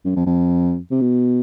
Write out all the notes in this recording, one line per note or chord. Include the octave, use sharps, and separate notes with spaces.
F#2
F2
F2
C3
B2